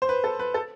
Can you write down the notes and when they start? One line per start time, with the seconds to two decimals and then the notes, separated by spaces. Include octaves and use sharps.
0.02 C5
0.09 B4
0.24 A4
0.39 B4
0.54 A4